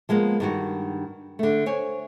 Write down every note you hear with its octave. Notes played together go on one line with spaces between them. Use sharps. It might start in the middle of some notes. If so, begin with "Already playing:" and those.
F3 G#3 A#3 B3
G2 D#3 F#4
D3 A3
C5 C#5 G#5